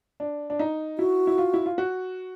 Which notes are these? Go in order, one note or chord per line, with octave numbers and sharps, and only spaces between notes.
D4
D4
D#4
E4 F#4
E4
F4
E4
F4
F#4